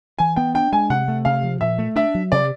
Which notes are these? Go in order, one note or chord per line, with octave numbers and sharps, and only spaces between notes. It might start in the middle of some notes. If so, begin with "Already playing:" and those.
E3 G#5
B3 G5
D4 G5
G#3 G#5
C3 F#5
A3
C3 F5
F3
A#2 E5
A3
D4 E5
F#3
C3 D5